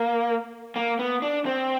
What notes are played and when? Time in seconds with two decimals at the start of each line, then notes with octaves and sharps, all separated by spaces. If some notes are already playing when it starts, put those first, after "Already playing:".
Already playing: A#3
0.76 A#3
0.99 B3
1.22 D4
1.46 C4